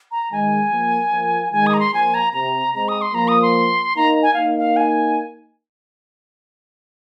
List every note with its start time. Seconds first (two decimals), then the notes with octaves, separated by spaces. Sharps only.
0.11 A#5
0.32 D#3 G#3 G#5
0.71 F3 A#3
1.12 F3 A#3
1.52 D#3 G#3 G#5
1.66 D#6
1.73 A#5
1.80 C6
1.93 F3 A#3 G#5
2.14 A#5
2.33 C3 A#5
2.74 G#3 C4 A#5
2.88 D#6
3.01 C6
3.14 F3 A#3 A#5
3.28 D#6
3.42 C6
3.96 A#3 D#4 A#5
4.23 G#5
4.34 A#3 D#4 F5
4.58 F5
4.76 G#5